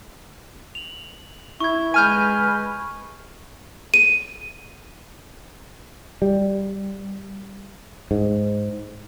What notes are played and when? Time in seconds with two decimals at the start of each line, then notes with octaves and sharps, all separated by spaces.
0.75 F7 F#7
1.60 E4 C#6 G#6
1.94 G#3 B4 G#5 F6 G6 D#7
3.94 D#7
6.22 G3
8.11 G#2